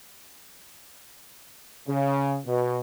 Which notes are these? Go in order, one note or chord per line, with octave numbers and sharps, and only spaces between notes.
C#3
B2